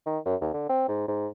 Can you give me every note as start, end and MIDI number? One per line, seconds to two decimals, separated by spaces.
0.06 0.19 51
0.26 0.35 42
0.42 0.52 39
0.54 0.66 50
0.69 0.86 60
0.88 1.04 44
1.08 1.28 44